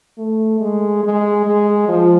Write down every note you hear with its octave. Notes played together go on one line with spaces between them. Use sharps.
A3
G#3
G#3
G#3
F3